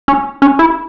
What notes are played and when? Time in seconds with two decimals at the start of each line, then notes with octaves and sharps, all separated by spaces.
0.08 C#4
0.42 C#4
0.59 E4